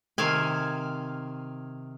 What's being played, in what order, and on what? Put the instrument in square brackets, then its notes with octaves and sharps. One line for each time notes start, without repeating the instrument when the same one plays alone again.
[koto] C3 D#3 F5 G#5